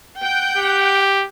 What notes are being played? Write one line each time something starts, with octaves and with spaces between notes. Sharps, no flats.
F#5 G5
G4